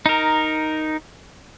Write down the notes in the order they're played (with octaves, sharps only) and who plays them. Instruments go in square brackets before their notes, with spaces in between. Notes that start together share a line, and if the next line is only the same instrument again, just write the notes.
[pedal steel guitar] D#4 A#4